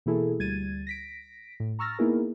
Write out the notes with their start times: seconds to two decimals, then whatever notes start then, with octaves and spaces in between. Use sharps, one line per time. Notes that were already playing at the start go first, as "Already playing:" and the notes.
0.06 B2 E3 A#3 E4 G#4 A4
0.39 D2 G3 G#6 A6 D#7
0.87 A#6 B6 D7
1.60 A2
1.79 A#5 C#6 E6 F6 A6 A#6
1.99 A#3 B3 D#4 E4 G#4 A#4